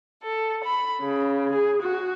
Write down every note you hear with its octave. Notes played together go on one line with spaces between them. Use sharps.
A4
B5
C#3
G#4
F#4